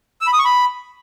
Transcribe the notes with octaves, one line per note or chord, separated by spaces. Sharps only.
E6
B5
D#6
C#6
B5